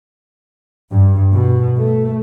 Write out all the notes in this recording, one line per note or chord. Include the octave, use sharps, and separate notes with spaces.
G2
B2
A3